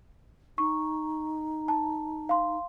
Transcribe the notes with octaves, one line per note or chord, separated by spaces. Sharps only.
D#4 C#6
A5
F5 C6